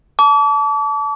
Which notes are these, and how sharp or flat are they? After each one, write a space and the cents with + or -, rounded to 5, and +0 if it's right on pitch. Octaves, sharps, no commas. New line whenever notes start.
A5 -15 D6 -40